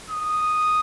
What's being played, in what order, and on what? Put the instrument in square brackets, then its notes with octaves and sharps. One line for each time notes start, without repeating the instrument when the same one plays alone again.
[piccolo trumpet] D#6